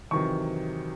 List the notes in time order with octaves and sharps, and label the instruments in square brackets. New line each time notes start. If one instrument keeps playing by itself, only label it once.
[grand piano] E2 C3 D#3 F#3 C#6